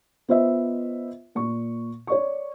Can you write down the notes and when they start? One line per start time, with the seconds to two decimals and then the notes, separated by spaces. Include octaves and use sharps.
0.28 B3 F4 C5 D#5 E5
1.35 A#2 C#6
2.07 C#5 D5 C#6